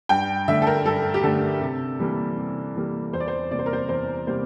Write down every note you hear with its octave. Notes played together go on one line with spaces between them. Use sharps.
G2 G5
D3 A3 E5
A4
A#4
G2 A4
G4
D3 A3 A4
C3
E3 G3 A#3
C3
E3 G3 A#3
E2 C5
D5
C5
C3 G3 A#3 D5
C5
A#4
C5
E2 C5
C3 G3 A#3 C5